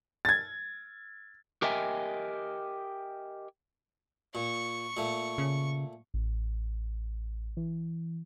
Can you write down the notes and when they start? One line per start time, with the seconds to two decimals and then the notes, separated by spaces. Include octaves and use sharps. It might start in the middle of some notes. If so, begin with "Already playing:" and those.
0.25 G#6 A6
1.62 G4 A#4 D#5 E5 G5 G#5
4.35 A#2 C#6
4.97 A#2 A3
5.38 C#3
6.14 A1
7.57 E3